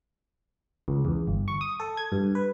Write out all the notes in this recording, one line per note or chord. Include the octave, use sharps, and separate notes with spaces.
C#2
E2
G1
C#6
D#6
A4
G#6
G2
B4